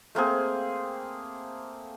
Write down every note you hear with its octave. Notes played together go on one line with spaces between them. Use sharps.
A3 A#3 C4 G#4